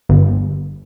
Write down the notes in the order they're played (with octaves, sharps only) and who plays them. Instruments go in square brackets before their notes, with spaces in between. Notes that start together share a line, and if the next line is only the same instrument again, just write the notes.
[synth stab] G1